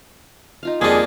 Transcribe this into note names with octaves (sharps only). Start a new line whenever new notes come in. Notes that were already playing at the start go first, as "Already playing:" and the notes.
D#4 F4 F5
F2 G3 A#3 D4 G#4 D#5